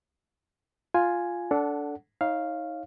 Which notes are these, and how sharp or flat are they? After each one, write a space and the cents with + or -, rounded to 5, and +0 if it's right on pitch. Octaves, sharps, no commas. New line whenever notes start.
F4 +0 G#5 +0
D4 -20 A4 +0 F#5 +0
D#4 +25 C#5 -15 F5 +0